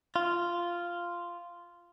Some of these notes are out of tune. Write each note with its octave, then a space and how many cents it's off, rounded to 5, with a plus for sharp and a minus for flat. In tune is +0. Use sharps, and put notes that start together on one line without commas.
F4 -5